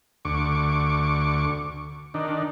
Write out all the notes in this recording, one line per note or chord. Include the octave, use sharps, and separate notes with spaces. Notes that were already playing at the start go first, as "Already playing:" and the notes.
D2 C#6 D6
D#3 D4